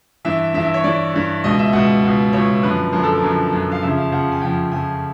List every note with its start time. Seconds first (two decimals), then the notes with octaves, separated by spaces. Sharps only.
0.25 G2 E3 E5
0.54 G2 E5
0.58 E3
0.65 E5
0.74 C#5
0.84 G2 E3 D5
1.14 G2 E3
1.44 C#2 B2 D#5
1.59 E5
1.73 C#2 B2 F#5
2.04 C#2 B2
2.33 C#2 B2 C#5
2.63 F#2 D3 F3 B4
2.93 F#2 D3 F3 A#4
3.03 A4
3.15 A#4
3.22 F#2 D3 F3
3.53 F#2 D3 F3
3.72 F5
3.82 F2 C#3 F3 E5
3.97 F5
4.12 F2 C#3 F3 F#5
4.32 G#5
4.41 F2 C#3 F3 G5
4.71 F2 C#3 F3 G#5